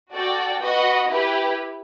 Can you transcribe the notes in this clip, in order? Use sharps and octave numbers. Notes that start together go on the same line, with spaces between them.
F#4 A4 D5 G5
F#4 B4 D#5
E4 G4 B4